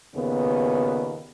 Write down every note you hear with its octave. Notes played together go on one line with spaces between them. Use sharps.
D#2 A#2 C#3 B3